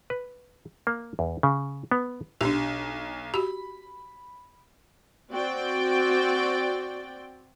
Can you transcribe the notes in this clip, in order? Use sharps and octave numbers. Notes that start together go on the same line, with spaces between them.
B4
A#3
E2
C#3
B3
B1 D4 G4
F#4 G4 B5
C4 F#4 D5 G5